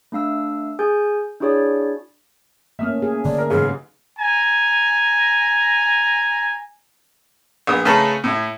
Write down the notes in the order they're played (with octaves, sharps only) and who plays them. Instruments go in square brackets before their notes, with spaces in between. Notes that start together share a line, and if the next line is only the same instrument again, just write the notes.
[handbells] A3 D4 F5 E6
G#4 G#5 G6
D4 E4 F#4 G#4 C#5 D5
[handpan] A3 A#3 C#4 [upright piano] E5 D#6 F6
[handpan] G#4
[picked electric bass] D3 [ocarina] D5
[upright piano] A#4
[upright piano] G#2 C#3 F#3 [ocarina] G#4 [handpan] B4 F5
[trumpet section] G#5 A#5
[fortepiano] A#1 B3 D#6
C#3 A3 C#4 B4 A5 A#5
A2 E4